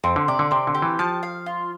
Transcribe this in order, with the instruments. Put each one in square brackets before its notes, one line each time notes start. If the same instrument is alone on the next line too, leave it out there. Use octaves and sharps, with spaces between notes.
[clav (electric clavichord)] F2 [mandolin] C4
[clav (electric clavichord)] D3
[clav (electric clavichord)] C3 [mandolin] D5
[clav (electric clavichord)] D3
[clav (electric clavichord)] C3 [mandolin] C4
[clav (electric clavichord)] D3
[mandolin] G4
[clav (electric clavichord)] E3
[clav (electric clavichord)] F3 [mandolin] A5
[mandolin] F5
F4